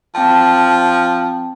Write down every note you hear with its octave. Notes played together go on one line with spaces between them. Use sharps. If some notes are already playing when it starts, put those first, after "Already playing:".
F3 C4 G5 A5